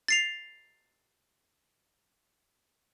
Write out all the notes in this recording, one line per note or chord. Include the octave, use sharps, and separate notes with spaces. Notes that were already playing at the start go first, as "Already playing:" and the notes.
A6 C7 F7